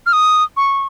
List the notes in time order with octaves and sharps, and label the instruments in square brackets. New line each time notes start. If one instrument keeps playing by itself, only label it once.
[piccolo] F6
D#6
C#6